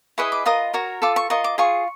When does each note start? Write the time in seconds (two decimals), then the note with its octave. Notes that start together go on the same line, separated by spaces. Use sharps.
0.18 E4 G#4 B4 D#5 C#6
0.32 D6
0.46 F4 A#4 D#5 D#6
0.74 F#4 A#4 C#5
1.02 F4 A4 D6
1.16 C#6
1.30 F4 A#4 D#5 C#6
1.44 D6
1.58 F4 G#4 C#6